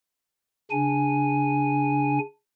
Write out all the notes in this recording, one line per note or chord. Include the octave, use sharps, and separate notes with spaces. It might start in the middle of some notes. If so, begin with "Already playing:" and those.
C#3 D4 G#5